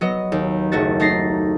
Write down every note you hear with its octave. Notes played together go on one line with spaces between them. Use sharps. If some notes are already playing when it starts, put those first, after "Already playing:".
F#3 B3 D#5
D#2
F#1 A3 F#4 A6
A3 D#4 A6 A#6 C7